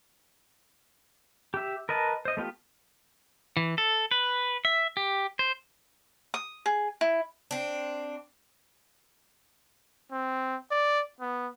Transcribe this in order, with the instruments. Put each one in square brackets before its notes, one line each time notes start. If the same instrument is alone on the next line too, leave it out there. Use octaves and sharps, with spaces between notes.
[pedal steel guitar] G4 E5
A#4 B4 D#5 A5
C5 D#5
A3 B3 F4 G4
E3
A4
B4
E5
G4
C5
[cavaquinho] D#6
G#4
E4
[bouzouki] C4 D4
[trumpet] C4
D5
B3